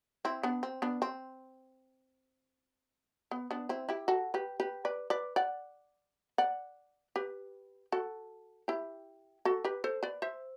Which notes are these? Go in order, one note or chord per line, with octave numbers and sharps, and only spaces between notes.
C4 E4
B3 D4
C4
B3 D4
C4
B3
B3 D4
C4 E4
E4 G4
F#4 A4
G4 B4
G4 B4
B4 D5
B4 D5
D5 F#5
D5 F#5
G4 B4
F#4 A4
E4 G4
F#4 A4
G4 B4
A4 C5
B4 D5
C5 E5